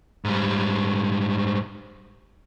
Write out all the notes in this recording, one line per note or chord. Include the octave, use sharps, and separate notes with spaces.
G#2 G3